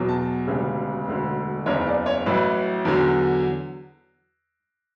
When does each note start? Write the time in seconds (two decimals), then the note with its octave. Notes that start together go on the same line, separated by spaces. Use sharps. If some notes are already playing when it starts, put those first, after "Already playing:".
Already playing: E2 B2 F#3
0.09 A5
0.47 E1 D2 C#3 G3
1.07 E1 D2 D3
1.66 F#1 E2 C#3 C#5
1.87 D5
2.06 C#5
2.26 A1 A2 F#3 B4
2.85 E2 D3 F#3